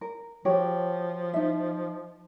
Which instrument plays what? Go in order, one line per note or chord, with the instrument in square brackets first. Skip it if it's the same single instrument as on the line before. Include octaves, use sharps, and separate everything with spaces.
[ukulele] A#4
[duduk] F3 [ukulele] F#4 G4 C#5
[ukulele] D#4 E5